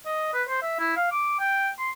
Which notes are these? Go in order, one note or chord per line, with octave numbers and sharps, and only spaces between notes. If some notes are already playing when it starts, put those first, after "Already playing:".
D#5
B4
C5
E5
E4
F5
D6
G5
C6